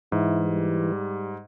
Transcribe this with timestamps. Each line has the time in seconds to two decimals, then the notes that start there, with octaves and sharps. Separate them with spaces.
0.12 G#2 E3 E4
0.45 G3